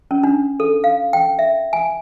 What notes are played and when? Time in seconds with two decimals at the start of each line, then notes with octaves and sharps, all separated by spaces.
0.11 C#4
0.24 D4
0.60 A4
0.84 F5
1.13 G5
1.39 E5
1.73 G#5